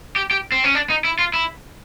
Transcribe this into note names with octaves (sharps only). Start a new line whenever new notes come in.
G4
G4
C4
C#4
D4
D#4
E4
F4
E4